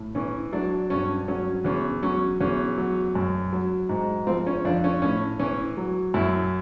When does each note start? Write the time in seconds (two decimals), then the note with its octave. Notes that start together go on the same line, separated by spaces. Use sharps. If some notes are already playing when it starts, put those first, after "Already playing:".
Already playing: A2
0.15 E3 C#4
0.53 F#3 D4
0.90 G2 C#4
1.28 F#3 C#4
1.64 E2 C#4
2.03 F#3 C#4
2.41 E2 C#4
2.78 F#3
3.15 F#2
3.53 F#3
3.89 G#2
4.27 F3 C4
4.47 C#4
4.65 F2 D4
4.84 C#4
5.02 A2 C#4
5.39 E3 C#4
5.77 F#3
6.14 F#2 E4